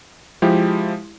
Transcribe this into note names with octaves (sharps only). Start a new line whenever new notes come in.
F3 G#3 E4 G4